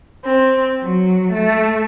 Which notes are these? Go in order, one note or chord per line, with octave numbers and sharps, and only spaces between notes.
C4
F#3
A3